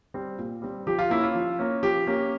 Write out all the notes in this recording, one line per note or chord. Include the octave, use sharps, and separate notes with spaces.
G3 C4
A#2
G3 C4
F3 G4
F4
A#3 C#4 E4
F4
F3
A#3 C#4
F3 G4
A#3 C#4